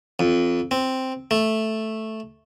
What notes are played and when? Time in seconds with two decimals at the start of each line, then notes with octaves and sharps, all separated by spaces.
0.19 F2
0.71 C4
1.31 A3